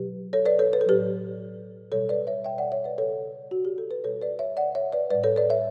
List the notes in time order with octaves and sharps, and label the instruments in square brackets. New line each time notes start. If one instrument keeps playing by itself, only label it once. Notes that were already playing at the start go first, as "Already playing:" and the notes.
Already playing: [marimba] B2 F#3 G4 B4
A4 C#5
B4 D5
A4 C#5
B4
A4
A2 F#3 G4 B4
B2 G3 A4 C#5
B4 D5
C#5 E5
E5 G5
D5 F#5
C#5 E5
B4 D5
C#3 G3 A4 C#5
F#4
G4
A4
B4
B2 G3 A4 C#5
B4 D5
C#5 E5
D5 F#5
C#5 E5
B4 D5
A2 G3 B4 D5
A4 C#5
B4 D5
C#5 E5